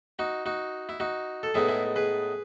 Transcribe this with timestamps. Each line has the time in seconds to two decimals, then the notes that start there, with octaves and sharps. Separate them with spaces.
0.19 D#4 F#4
0.46 D#4 F#4
0.89 E4
1.00 D#4 F#4
1.43 A4
1.54 A2 G#3 B3 D#4 E4 G#4
1.68 E4 G#4
1.96 G#4 B4